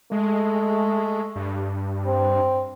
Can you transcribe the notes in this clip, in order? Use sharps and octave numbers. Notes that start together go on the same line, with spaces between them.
G#3 A3
G2
C4